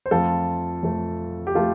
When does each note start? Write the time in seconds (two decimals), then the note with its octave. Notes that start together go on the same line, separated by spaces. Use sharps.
0.06 C5
0.11 F2 F3 A3 F4 A4
0.83 F2 F3 A3
1.47 G4
1.55 F3 A3 F4 A4